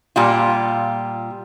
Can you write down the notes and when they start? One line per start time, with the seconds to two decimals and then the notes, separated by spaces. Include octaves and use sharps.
0.16 A#2 G3 F4